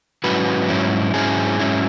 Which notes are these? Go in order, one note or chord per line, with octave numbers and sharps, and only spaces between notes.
G#2 F#3 C#4 E4 F#4 B4
G#2 F#3 C#4 E4
G#2 F#3 C#4 E4 G#4
G#2 F#3 C#4 E4